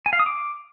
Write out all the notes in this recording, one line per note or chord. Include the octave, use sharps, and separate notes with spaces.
G#5
F5
D#6
D6